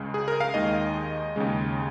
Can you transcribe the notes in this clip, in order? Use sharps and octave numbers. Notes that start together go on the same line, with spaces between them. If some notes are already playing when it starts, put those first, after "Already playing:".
Already playing: C#2 C#3 G#3
G#4
A#4
F5
D#2 D#3 G#3 D#5
D#2 C#3 G#3